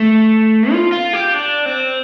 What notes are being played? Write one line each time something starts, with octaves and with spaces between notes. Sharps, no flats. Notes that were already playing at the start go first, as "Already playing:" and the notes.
Already playing: A3
F4
F4
G4
D4
C4